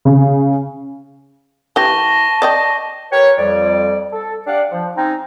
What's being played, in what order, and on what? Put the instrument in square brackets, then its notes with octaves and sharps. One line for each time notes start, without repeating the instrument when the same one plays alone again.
[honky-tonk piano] C#3
[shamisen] E3 G4 [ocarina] A5 [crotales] C#6 A#6 G7
[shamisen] D5 D#5 G5
[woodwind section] G4 A#4 B4 C#5
F2 G3 D5
A4
D4 G4 D5 F5 F#5
F3
C4 C#4 D#4